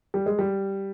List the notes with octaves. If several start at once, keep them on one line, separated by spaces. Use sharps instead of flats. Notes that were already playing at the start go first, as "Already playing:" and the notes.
G3
G#3
G3